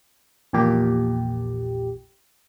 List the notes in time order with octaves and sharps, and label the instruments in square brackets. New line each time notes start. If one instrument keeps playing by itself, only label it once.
[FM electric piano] A#1 E2 A#2 G4